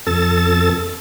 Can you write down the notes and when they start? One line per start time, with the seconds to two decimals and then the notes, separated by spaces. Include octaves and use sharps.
0.07 F2 A4 A6